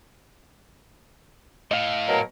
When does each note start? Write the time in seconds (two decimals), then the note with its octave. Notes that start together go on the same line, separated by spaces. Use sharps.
1.71 A2 D#5 F5
2.07 B2 F#3 A#4